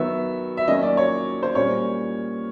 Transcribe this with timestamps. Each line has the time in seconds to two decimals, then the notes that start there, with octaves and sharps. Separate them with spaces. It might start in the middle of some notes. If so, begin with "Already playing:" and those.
Already playing: D#3 F#3 B3 E5
0.57 E5
0.67 D#3 F#3 A#3 C#4 D#5
0.83 D5
0.97 C#5
1.43 C5
1.55 A#2 G3 A#3 C#4 C#5